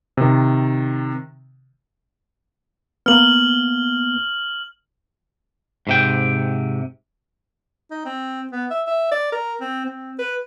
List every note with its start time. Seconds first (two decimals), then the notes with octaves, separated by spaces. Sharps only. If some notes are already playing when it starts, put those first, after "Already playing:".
0.17 C3 D#3
3.06 A#3 B3 F6 F#7
5.87 G#2 C3 G5
7.91 D#4
8.05 C4
8.52 B3
8.70 E5
8.87 E5
9.11 D5
9.32 A#4
9.61 C4
9.85 C4
10.19 B4